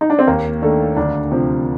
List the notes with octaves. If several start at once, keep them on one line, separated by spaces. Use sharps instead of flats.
D#4
D4
C4
D#2 A#3
D#3 A3 D4 A4
D2 D4
C3 F3